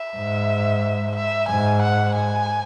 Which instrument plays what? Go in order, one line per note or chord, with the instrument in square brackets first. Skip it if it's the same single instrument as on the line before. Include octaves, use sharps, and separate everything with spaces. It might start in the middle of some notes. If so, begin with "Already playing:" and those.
Already playing: [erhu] E5
[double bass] G#2
[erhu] E5
[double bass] G#2 [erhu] G#5
[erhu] F#5
G#5